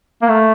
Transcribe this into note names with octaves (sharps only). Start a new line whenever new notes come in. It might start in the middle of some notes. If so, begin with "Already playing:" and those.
A#3
A3